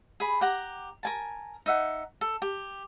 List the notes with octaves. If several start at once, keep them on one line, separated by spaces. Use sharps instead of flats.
G#4 B5
G4 F#5 A#5
A#4 G#5 A5
D#4 E5 F#5
A4
G4